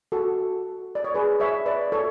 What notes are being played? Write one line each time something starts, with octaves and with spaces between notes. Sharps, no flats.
F#4 A4
D5
C#5
G#4 B4
C#5 E5
B4 D5
A4 C#5